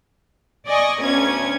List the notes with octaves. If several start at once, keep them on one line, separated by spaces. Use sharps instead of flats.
D5 D#5 G#5 C#6
D2 B3 C#4 G#6